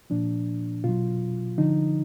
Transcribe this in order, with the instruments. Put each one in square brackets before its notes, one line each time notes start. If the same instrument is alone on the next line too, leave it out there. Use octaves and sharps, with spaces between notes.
[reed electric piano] A#2 F3 D4
B2 F#3 F4
D3 F3 D#4